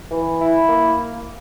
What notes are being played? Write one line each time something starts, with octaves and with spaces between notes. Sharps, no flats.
E3
E4
A#3